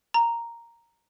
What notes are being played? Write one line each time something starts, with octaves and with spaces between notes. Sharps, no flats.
A#5